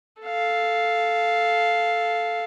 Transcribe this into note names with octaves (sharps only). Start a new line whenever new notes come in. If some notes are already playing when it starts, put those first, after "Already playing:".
A4 F5